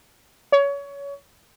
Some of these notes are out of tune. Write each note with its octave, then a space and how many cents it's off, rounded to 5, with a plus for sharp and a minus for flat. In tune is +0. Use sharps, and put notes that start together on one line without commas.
C#5 +25